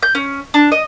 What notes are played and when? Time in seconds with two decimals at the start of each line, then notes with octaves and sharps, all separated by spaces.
0.03 G6
0.15 C#4
0.54 D4
0.72 D#5